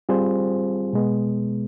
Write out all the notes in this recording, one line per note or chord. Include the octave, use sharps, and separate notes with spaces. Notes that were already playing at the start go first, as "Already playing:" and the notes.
G3 C4 F4 G#4 C5
B2 G#3 B3